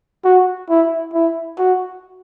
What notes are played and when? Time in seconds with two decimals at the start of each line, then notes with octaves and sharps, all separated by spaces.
0.24 F#4
0.69 E4
1.14 E4
1.58 F#4